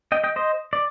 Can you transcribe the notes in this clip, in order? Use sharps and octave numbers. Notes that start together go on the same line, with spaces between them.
D#5 G5
D#5 G5
C5 D#5
D5